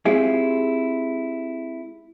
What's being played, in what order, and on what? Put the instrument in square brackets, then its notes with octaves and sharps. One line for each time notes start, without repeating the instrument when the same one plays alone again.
[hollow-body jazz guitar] G#3 C4 E4 F4 G4 G#4